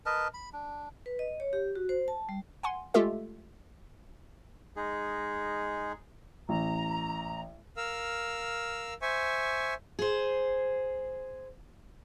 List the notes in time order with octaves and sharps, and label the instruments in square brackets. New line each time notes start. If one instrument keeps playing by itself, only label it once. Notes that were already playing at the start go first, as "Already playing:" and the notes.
[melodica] A#4 B4 D#5 A5
B5
D4
[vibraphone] B4
D#5
C#5
G4
F#4
C5
A5
G3
[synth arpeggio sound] F#5 G#5 C6
G#3 A3 F4 G4 A4 E5
[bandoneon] G#3 D#4 G#4
[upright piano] A1 [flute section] A#5
[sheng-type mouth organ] A#4 F5 E6
C5 E5 G#5 C#6
[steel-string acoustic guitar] G#4 C5